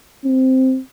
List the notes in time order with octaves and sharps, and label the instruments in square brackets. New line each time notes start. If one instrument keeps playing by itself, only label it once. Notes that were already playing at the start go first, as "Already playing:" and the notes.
[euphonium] C4